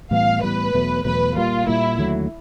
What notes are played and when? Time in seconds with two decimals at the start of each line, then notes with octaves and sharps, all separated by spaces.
0.11 A2 E3 G3 B3 F5
0.43 A2 E3 G3 B3 B4
0.74 E2 B2 F#3 A3
1.05 E2 B2 F#3 A3 B4
1.36 A#2 G3 A#3 F4
1.67 A#2 G3 A#3 E4
1.98 D#2 D3 F#3 A3